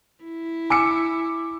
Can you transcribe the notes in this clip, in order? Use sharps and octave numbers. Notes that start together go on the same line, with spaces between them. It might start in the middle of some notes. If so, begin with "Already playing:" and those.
E4
G#5 D6 E6 C#7